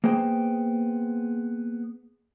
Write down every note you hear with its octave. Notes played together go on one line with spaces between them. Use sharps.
A#3 B3 G#4 C5 G5